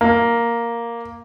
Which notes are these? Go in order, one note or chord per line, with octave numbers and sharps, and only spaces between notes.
A#3